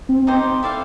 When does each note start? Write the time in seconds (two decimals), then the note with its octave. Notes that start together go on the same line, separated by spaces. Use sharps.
0.09 C4
0.27 D#4 G4 C5
0.63 E4 A4 D5 F5